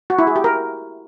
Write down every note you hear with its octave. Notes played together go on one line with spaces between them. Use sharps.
F#4
E4
G#4
G4
A#4